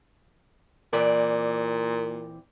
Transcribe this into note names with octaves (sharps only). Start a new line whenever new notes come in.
A#2 E3 C4 D5